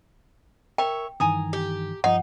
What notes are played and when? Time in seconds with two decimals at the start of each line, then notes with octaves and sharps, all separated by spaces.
0.78 A#4 C#5 E5 G5
1.20 G2 D#3 E3 G#5 A#5 D#6
1.53 G4
2.04 G2 F3 D#4 F#5